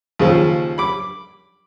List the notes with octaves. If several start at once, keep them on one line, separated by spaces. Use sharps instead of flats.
D#2 C#3 F3
B5 D6